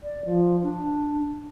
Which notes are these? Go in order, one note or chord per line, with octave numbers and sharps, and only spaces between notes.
D5
F3
D4